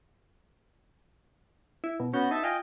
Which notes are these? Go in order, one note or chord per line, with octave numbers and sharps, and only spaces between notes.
E4
B2
B3 C#4 F#4 G6
D#4 E5 A5
F4 D#5 G5 G#5